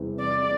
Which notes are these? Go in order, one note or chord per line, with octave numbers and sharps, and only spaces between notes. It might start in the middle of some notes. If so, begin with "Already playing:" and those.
Already playing: E2 C3 G3 C4 E4
D5